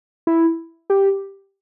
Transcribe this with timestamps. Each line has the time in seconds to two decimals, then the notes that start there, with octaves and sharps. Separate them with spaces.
0.27 E4
0.90 G4